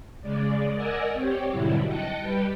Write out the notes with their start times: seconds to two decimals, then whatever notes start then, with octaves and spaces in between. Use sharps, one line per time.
0.22 C#3 G#3 D5
0.74 A#4 D5 D#5 F#5 G#5 E6
1.12 C4 G4 C#5
1.51 G#2 B2 D3 F#3 G3 E4
1.86 D#5 G5 A5 F#6 C#7
2.19 G3 G4 B4